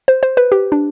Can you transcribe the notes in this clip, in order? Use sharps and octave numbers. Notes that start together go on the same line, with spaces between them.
C5
C5
B4
G4
D4